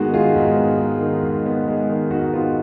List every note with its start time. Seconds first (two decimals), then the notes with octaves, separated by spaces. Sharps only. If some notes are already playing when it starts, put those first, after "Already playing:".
Already playing: G#2 D#3 G#3 B3 D#4 F#4
0.13 D#3 F4 G#4
0.36 G#2
0.57 B3
0.79 G#3
1.01 D#3
1.23 G#2
1.46 B3
1.68 G#3
1.89 D#3
2.11 G#2 D#4 F#4
2.33 B3 F4